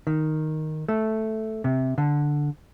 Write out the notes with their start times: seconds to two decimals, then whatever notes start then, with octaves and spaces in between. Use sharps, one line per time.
0.07 D#3
0.89 A3
1.64 C3
1.98 D3